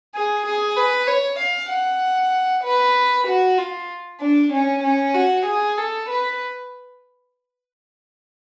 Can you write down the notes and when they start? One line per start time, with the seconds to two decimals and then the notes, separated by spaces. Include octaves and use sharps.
0.15 G#4
0.46 G#4
0.77 B4
1.07 C#5
1.39 F5
1.71 F#5
2.64 B4
3.27 F#4
3.58 F4
4.21 D4
4.53 C#4
4.84 C#4
5.15 F#4
5.46 G#4
5.78 A4
6.09 B4